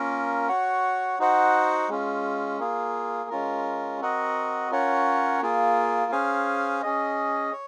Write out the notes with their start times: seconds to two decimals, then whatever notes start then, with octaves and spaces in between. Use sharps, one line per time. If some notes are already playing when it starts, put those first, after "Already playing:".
Already playing: A#3 C#4 F4 A#4
0.48 F#4 C#5 F#5
1.19 D#4 F#4 C5 F#5
1.89 G#3 C#4 F4
2.59 A#3 F4 G#4
3.30 G#3 C#4 F4 A#4
4.00 C4 F#4 A#4 D#5 F#5
4.71 C#4 F4 A#4 C#5 F#5
5.42 A#3 F4 G#4
6.12 C#4 G#4 C5 F5 G#5
6.82 C#4 G#4 D#5
7.52 C#5